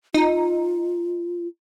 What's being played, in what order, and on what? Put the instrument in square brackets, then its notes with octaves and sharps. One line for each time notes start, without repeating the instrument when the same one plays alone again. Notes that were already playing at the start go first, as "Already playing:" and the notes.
[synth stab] D#4 [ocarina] F4